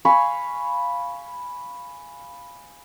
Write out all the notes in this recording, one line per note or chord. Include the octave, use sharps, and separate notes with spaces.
F5 G#5 B5 C#6